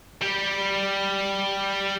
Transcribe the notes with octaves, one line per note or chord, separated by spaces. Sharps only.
G3 G4